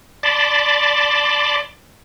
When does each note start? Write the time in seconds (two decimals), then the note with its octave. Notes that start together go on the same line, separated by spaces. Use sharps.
0.23 D5 A5 B5 C6 D6